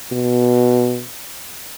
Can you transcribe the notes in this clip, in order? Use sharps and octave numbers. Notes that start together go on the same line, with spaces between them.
B2